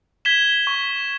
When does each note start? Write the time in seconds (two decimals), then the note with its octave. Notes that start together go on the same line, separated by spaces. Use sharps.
0.25 G#6 B6 E7 G7
0.67 C#6